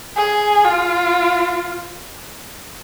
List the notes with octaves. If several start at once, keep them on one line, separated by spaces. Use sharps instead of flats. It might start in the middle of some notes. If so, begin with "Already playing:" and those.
G#4
F4